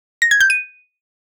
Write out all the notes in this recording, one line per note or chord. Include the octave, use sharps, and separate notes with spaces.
A#6
G#6
G6
D#7